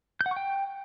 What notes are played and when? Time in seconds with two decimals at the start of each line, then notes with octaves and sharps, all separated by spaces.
0.21 G6
0.26 F#5
0.31 C#6
0.36 G5